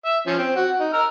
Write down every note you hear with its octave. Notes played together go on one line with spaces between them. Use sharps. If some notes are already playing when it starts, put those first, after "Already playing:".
E5
F3 C#4
C4
F#4
D#4
A#5 E6 F6